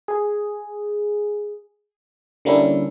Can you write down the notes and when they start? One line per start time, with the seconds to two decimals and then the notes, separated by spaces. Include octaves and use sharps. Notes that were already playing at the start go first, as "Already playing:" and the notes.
0.08 G#4
2.45 D3 G3 A#3 C#4 D4 E4